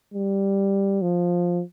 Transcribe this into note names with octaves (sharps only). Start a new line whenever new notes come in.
G3
F3